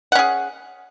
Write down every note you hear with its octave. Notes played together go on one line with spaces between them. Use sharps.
C#4 G#4 F#5